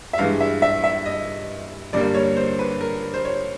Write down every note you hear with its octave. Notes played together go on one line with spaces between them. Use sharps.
E5
G2 E3 G#3 F5
E5
E5
E5
D#5
G2 D3 G3 A#3 D5
C#5
C5
B4
A#4
C5
C#5